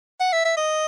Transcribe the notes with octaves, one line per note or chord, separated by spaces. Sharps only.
F#5
E5
E5
D#5